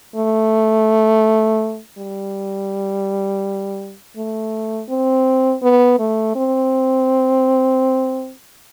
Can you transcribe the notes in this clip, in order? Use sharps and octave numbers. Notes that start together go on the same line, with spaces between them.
A3
G3
A3
C4
B3
A3
C4